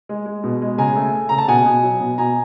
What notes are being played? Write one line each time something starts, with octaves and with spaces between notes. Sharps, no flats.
G#3
G#3
B2
G#3
C#3 G#5 A#5
A3
A3
C#3 A#5
A5
B2 F#5 G#5
B2
F#3
B2
B2 G#5 A#5